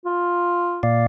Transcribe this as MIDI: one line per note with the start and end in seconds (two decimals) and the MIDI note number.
0.06 0.84 65
0.83 1.07 46
0.83 1.07 74
0.83 1.07 77